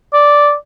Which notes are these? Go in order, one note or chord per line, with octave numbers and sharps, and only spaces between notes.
D5